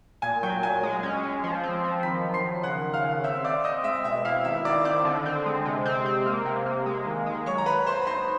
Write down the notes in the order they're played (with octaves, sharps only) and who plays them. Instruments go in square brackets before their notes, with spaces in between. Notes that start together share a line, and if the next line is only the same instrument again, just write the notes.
[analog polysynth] A#2 [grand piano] G#5 G#6
[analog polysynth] F#3 [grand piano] G5 G6
[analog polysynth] A#2 [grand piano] G#5 G#6
[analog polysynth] G#3
C#4
G#3
F3
C4
F3
[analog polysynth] D#3 [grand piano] B5 B6
[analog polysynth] F#3
[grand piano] C6 C7
[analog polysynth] D#3
[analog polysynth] C#3 [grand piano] F#5 F#6
[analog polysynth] C#3
[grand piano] F5 F6
[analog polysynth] C#3
[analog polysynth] C4 [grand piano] E5 E6
[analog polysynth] C4 [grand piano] D5 D6
[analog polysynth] C4 [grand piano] D#5 D#6
[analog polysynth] G#3 [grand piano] E5 E6
[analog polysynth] B2 [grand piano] E5 E6
[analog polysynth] E4 [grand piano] F5 F6
[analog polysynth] D#3 [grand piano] E5 E6
[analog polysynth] D#3 [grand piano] D5 D6
[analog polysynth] C4 [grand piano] D5 D6
[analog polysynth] D3
C4
G#3
C3
C4
C4
A#3
C3
A#3
G#3
D#3
G#3
[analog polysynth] F#3 [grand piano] C#5 C#6
[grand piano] A#5
[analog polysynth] F#3 [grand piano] B4 B5
[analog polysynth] F#3 [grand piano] C5 C6
[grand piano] B5
[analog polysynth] D#4 [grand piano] C5 C6